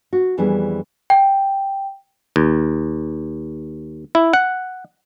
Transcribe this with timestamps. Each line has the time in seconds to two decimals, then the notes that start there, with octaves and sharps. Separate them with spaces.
0.13 F#4
0.38 F2 E3 G3 B3 D4 G#4
1.10 G5
2.36 D#2
4.15 E4
4.33 F#5